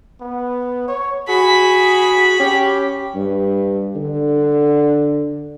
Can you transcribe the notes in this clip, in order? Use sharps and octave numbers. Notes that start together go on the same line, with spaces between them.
B3
C#5
F#4 G#4 B5
C#4 G4
G2
D3